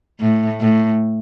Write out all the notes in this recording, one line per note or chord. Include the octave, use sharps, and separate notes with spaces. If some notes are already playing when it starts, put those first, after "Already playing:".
A2
A2